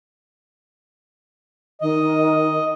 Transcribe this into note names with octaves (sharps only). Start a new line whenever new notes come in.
D#3 D#5